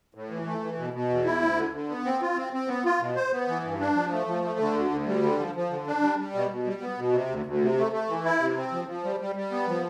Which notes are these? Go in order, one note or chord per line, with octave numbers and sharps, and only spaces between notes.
A2
E3
A3
E3
B2
B2
E2
E4
D2
D3
D3
B3
C4
F4
C4
C4
B3
F4
B2
C5
B3
E3
G2
D4
F3
A3
F3
A3
D3
D2
D2
G3
D3
F3
F3
D3
D4
G3
G3
B2
B2
G3
B3
B2
C3
D2
D2
C3
A3
A3
E3
E4
C3
C4
F3
F3
G3
G3
G3
B3
F3